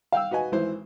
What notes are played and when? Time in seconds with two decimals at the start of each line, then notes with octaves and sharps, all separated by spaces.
0.12 F5 G5 E6
0.31 F#4 B4 D#5 G#5
0.52 G#1 E3 C5